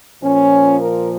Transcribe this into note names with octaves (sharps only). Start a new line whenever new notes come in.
A#2 F3 C#4
A#4